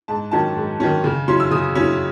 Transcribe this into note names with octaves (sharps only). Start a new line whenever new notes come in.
G#2 A5
D#3 F#3 C#4 A5
G#2
D#3 F#3 C#4
C#3
F#3 C#4 E4 C6
E6
C#3 D#6
F#3 C#4 E4